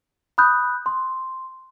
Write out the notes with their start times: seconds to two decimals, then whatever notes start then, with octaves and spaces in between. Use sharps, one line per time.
0.38 B5 D#6 F#6 G6
0.86 C6